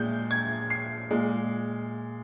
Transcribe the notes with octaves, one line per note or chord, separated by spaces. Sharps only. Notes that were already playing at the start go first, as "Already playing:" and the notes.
Already playing: A#2 G#3 G6
G#6
C7
A#2 G#3